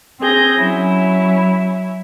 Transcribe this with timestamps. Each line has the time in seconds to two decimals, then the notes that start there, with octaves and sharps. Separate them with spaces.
0.20 C4 G#4 G6 A#6
0.55 F#3 C#4 E4